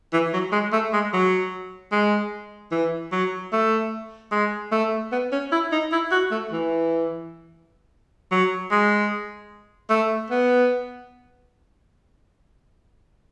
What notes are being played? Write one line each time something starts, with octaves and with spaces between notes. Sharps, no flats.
E3
F#3
G#3
A3
G#3
F#3
G#3
E3
F#3
A3
G#3
A3
B3
C#4
E4
D#4
E4
F#4
A3
E3
F#3
G#3
A3
B3